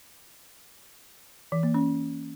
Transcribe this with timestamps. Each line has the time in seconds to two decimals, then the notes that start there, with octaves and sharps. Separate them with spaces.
1.52 E3
1.63 A#3
1.74 C#4